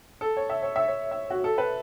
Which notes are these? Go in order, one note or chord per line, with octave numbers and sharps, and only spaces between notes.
A4
C#5
E5
C#5
E5
C#5
E5
F#4
A4
B4